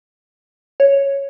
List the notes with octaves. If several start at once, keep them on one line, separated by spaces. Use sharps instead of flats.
C#5